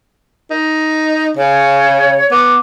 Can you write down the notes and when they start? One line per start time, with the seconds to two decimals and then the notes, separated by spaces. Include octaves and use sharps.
0.51 D#4
1.37 C#3 C#5
2.31 B3 D6